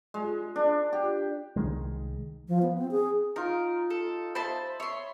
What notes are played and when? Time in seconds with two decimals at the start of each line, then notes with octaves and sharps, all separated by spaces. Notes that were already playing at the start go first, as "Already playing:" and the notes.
0.14 G#3
0.56 D4
0.93 G4
1.56 C2 D#3 G#3
2.48 F3
2.62 B3
2.78 C4
2.91 G#4
3.36 D#4 F4 A#4
3.90 A4
4.35 C5 E5 A5 B5
4.80 C#5 E5 C6